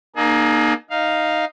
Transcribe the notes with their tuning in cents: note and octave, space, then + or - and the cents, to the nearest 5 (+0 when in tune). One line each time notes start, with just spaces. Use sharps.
A#3 +20 D#4 -35 G#4 +35
D#4 +0 F5 +0